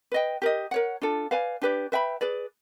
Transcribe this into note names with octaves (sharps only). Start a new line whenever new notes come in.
B4 D#5 G5
G4 A#4 D#5
A#4 C#5 F#5
D4 F4 A4
B4 D5 F5 G#5
D4 G4 B4 D5
B4 E5 G5 B5
G#4 B4 D5